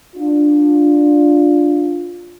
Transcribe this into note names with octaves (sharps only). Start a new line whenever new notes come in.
D4 F4